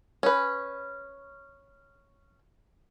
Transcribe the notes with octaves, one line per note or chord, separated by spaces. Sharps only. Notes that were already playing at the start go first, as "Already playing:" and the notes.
C#4 B4